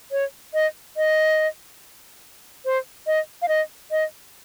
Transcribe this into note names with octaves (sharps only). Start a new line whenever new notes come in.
C#5
D#5
D#5
C5
D#5
F5
D#5
D#5